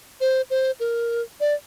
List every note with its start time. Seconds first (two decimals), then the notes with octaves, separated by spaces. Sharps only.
0.21 C5
0.50 C5
0.80 A#4
1.40 D5